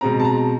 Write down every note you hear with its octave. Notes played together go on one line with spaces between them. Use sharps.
B2 G#3 C4 A#5
A5
A#5